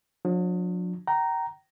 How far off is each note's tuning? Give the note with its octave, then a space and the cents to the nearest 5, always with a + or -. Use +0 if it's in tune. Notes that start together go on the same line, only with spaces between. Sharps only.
F#3 -45 D4 +0
G5 -35 A#5 +0